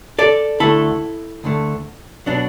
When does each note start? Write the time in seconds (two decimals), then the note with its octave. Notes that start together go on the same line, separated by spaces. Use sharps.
0.19 A4 D5
0.60 D2 D3 A3 E4 A4
1.44 D2 D3 A3
2.26 B2 F#3 D4